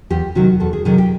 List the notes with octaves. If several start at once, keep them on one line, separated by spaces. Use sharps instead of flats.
E2 G4
C3 D#3 F#3 F#4
E2 A4
G#4
C3 D#3 F#3 G#4
G4